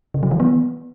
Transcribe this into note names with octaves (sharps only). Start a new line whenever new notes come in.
C#3
F#3
E3
B3